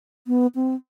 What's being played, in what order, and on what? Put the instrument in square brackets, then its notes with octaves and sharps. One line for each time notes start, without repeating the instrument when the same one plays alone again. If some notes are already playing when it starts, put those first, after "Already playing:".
[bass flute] B3
C4